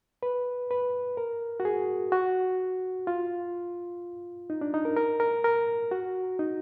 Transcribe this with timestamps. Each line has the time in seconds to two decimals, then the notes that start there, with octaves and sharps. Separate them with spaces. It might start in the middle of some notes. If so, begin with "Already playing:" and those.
0.23 B4
0.71 B4
1.17 A#4
1.60 F#4
1.65 G#4
2.12 F#4
3.07 F4
4.50 D#4
4.61 D4
4.74 D#4
4.85 A#4
4.96 A#4
5.20 A#4
5.44 A#4
5.91 F#4
6.39 D#4